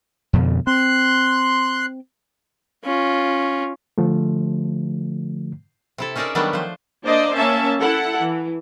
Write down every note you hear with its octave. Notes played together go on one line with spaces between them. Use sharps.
F2 B2 D3
C4 C6 F#6
C#4 F4
D3 F3 A3
C3 E4 A4
C#4 D#4 G#4 A#4 D5 E5
D#3 F#3 G3 A3 B3 D4
F3 C5
A#3 D4 C5 D5 D#5
A#3 C#4 E5 A5
E4 A4 F#5
E3